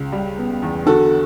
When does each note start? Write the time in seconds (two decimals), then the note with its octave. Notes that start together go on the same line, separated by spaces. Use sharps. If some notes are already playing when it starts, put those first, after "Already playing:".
Already playing: C#2
0.12 G3
0.38 B3
0.62 E2
0.86 D3 F#4 A4